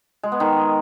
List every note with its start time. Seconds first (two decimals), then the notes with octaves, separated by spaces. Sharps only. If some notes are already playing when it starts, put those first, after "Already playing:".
0.23 G#3
0.32 B3
0.40 D#3